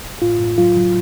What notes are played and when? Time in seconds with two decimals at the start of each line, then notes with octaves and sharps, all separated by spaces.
0.22 A2 F4
0.41 A2
0.58 F#3 F4
0.77 F#3